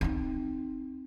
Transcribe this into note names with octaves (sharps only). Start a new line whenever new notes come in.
C4 D#4